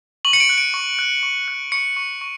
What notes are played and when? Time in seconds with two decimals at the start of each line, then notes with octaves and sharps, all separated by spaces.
0.25 C#6 F#7
0.33 C#7
0.40 D7
0.49 F#6
0.58 D7
0.74 C#6
0.99 F#6
1.23 C#6
1.48 F#6
1.72 C#6 C#7
1.97 C#6
2.21 C#6